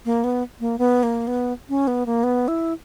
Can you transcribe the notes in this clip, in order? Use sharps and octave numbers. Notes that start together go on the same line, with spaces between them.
A#3
B3
A#3
B3
A#3
B3
C#4
B3
A#3
B3
E4